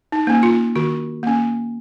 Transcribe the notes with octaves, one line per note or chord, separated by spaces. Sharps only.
D#4
A#3 C#4
F4
D#3 F#4
A#3 C#4